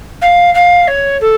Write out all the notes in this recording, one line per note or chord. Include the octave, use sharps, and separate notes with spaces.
F5
F5
C#5
A4